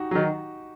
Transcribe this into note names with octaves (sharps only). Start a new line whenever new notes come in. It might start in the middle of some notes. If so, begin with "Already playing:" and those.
Already playing: D#4 F#4 G4
D#3 F#3